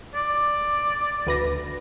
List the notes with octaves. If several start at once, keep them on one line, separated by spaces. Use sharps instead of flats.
D5
D2 B4 A#6